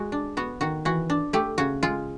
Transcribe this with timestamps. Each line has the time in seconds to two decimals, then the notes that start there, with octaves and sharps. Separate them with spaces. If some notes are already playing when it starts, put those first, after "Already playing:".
Already playing: G#3 F#4
0.12 D4
0.37 B3 F#4
0.61 D#3 F#4
0.85 E3 F#4
1.10 D4
1.33 A3 G4
1.58 C#3 F#4
1.83 G#3 F4